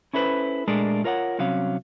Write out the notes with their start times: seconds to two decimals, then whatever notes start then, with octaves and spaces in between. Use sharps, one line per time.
0.13 C#4 E4 A4 B4 C5
0.68 A#2 G#3 A3 D4 G#4 A#4
1.04 F4 A#4 C#5 F5 F#5
1.38 C2 C3 F#3 C#4 F5